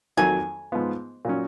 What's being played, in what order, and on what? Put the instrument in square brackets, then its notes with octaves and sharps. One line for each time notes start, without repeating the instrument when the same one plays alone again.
[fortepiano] F2 D#3 F#3 A#3 [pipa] G#5
[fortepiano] G#2 F3 B3 F4
A#2 F#3 C#4